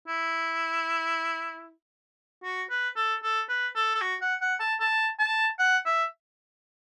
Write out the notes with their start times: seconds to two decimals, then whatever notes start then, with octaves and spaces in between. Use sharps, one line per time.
0.08 E4
2.44 F#4
2.70 B4
2.96 A4
3.23 A4
3.49 B4
3.75 A4
3.95 A4
4.01 F#4
4.21 F#5
4.41 F#5
4.60 A5
4.80 A5
5.19 A5
5.59 F#5
5.86 E5